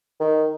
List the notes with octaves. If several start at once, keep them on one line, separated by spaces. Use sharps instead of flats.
D#3